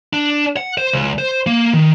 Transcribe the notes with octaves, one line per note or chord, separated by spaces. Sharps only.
D4
F#5
C5
C#2
C5
A#3
D#3